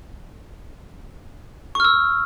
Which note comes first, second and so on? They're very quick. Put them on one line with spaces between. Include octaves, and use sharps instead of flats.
C#6 F6 E6